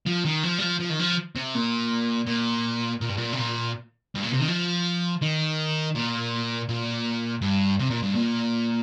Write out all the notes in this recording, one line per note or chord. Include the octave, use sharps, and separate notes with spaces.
F3
D#3
F3
G3
F3
F3
D#3
F3
C3
A#2
A#2
A#2
G2
A#2
C3
A#2
G2
A#2
C3
D#3
F3
D#3
A#2
A#2
G2
C3
A#2
G2
A#2